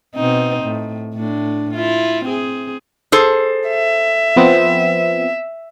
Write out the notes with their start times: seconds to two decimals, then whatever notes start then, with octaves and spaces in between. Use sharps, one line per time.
0.16 B2 C4 D#4
0.63 A2
1.15 A2 D4
1.74 E4 F4
2.25 C4 G#4
3.12 G#4 A4 C5
3.68 E5
4.36 F3 B3 C4